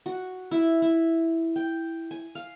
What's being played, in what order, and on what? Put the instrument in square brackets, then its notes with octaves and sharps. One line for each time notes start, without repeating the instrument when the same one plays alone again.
[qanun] F#4
E4
E4
G5
G#5
F5